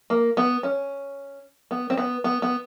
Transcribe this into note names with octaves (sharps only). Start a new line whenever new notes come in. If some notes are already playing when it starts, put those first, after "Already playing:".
A#3
B3
C#4
B3
C4
B3
B3
B3